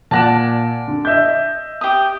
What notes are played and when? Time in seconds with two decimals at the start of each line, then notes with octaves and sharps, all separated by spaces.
0.11 A#2 D5 F#5 A5 A#6 E7
0.88 D3
1.05 D#5 E5 G6
1.81 G4 D#6